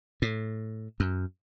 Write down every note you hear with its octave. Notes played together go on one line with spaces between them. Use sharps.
A2
F#2